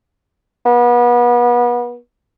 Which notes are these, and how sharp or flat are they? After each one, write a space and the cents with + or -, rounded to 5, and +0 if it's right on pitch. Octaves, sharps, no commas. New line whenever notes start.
B3 -30